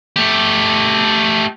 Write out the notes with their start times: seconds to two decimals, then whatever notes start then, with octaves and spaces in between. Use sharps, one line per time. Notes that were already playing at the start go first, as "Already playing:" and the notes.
0.16 A3 G4